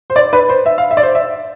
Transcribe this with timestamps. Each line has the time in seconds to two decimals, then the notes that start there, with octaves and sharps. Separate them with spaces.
0.10 C5
0.16 D5
0.33 B4
0.49 C5
0.66 E5
0.78 F5
0.91 E5
0.97 D5
1.03 C5
1.15 E5